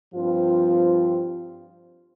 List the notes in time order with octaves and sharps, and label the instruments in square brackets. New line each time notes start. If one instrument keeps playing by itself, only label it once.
[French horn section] G2 F3 C4 F4 C5